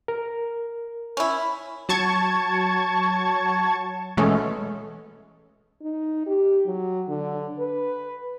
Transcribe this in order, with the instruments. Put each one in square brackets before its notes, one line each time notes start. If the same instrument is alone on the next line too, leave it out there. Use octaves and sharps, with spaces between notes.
[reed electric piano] A#4
[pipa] C#4 E4
[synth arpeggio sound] F#3 A5 C#6 G#6
B2 E3 G#3 A3 C#4 A4
[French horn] D#4
G4
F#3
D3
B4